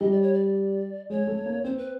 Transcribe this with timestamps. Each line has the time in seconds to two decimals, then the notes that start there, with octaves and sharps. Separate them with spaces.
0.01 G3 D#5
0.12 D5
0.22 C#5
0.33 D5
1.10 G#3 C#5
1.27 A3
1.46 A#3
1.64 C4 C5
1.78 B4